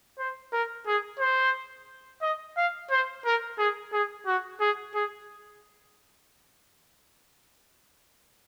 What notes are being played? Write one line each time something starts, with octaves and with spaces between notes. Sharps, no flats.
C5
A#4
G#4
C5
D#5
F5
C5
A#4
G#4
G#4
F#4
G#4
G#4